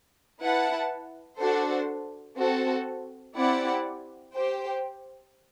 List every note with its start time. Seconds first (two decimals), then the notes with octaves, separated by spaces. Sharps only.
0.41 E4 B4 F#5 A5
1.39 D4 F#4 A4 C5
2.37 C4 F#4 A4
3.35 C4 E4 G4 D5 F#5
4.34 G4 C5 G5